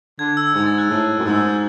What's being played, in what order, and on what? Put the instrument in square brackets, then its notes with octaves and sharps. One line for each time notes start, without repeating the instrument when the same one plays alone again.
[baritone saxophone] D3 [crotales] G#6
[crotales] E6
[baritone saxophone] G#2 [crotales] G#6
[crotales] A6
F#6
[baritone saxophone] A2
F#2
[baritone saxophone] G#2 [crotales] E6
[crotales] F#6
G#6